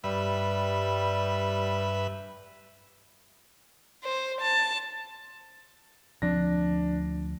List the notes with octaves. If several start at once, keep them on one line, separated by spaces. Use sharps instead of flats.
G2 G3 B4 E5
C5
A5
D2 F3 C4 D4 A#6